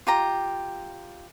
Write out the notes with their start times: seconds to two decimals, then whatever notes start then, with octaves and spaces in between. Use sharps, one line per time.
0.07 F4 G4 A#5